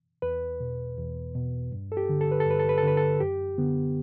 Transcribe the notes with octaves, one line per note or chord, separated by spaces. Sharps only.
E2 B4
B2
E2
B2
G2
A4
G4
D3
A4
B4
A4
G2 B4
A4
B4
A4
D3 B4
A4
F#2 G4
D3 B3